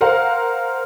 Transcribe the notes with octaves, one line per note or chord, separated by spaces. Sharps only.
A#4 C5 F5 F#5 A#5